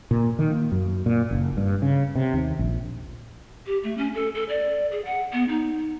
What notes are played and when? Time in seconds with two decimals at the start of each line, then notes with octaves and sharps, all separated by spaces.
0.11 A#2
0.39 D#3
0.51 A#3
0.72 F#2
1.06 A#2
1.31 F#1
1.57 G2
1.82 C#3
2.15 C3
2.34 D#2
2.59 A#1
3.66 G4
3.83 A3
3.98 C#4
4.14 A4
4.34 A4
4.49 D5
4.91 G#4
5.05 F#5
5.33 B3
5.49 D#4